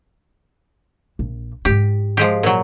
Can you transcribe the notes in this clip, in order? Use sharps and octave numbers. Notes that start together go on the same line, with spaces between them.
A#1
G#2 E4 G4
F3 G#3 G4
A#2 F#3